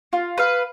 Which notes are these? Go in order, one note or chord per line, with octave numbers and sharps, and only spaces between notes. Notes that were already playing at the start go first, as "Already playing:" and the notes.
F4
B4 F5